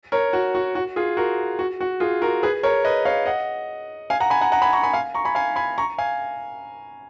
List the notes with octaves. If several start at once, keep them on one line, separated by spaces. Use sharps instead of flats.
A#4 C#5
F#4
F#4
F#4
F4 G#4
F#4 A#4
F#4
F#4
F4 G#4
F#4 A#4
G#4 B4
A#4 C#5
B4 D#5
C#5 F5
D#5 F#5
F5 G#5
F#5 A#5
G#5 B5
F#5 A#5
F#5 A#5
G#5 B5
A#5 C#6
G#5 B5
F5 G#5
A#5 C#6
G#5 B5
F5 G#5
G#5 B5
A#5 C#6
F5 G#5